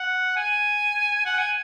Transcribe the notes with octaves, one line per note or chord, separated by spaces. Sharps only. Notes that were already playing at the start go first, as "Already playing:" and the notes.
Already playing: F#5
G#5
F#5
G#5